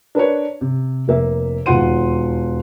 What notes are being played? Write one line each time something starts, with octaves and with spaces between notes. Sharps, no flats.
D4 A#4 B4 C#5
C3
F1 A#3 E5
E1 D#2 F4 F#5 C6 D#7